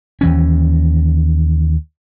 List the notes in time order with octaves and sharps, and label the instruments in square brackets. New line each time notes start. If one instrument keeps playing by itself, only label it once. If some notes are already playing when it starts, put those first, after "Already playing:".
[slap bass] D#2 E3 C#4